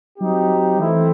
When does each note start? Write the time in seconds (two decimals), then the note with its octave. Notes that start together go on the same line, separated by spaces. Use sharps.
0.19 F#3 C4 D#4 G4
0.80 E3 A3 C4 E4